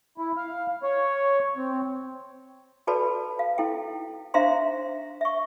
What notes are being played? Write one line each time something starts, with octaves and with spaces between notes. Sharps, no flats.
E4
F5
C#5
C4
F#4 A4 B4 D5 A5 B5
F5
E4 A4 G5
D4 C5 E5 F5 A#5 C6
E5 C#6